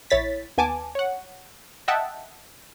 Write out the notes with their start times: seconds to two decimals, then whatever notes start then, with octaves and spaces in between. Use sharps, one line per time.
0.10 A#1 E4 C#5 A6 B6
0.57 D#2 B3 G#5 A5 D6
0.95 C#5 F#5
1.88 D#5 E5 F#5 G5 A5